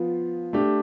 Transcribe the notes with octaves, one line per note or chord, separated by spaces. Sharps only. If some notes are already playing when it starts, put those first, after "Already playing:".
Already playing: F3 B3 F4
A3 D4 G4